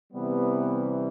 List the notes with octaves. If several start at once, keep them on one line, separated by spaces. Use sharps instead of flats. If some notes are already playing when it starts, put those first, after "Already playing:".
C3 E3 G3 B3